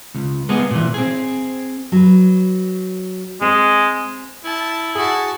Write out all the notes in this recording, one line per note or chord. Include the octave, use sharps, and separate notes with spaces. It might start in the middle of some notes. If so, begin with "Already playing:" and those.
C#2
G#3 A#3 B3 G#4
A#2 E3
C4 G#4
F#3 B4
G#3 C4 G#4
E4 A5
F#4 G#4 A5